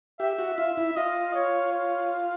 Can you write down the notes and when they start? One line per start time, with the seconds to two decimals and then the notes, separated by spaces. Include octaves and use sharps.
0.20 G4 E5
0.39 F#4
0.58 F4 E5
0.77 E4
0.96 F4 D#5
1.34 C#5
1.73 C#5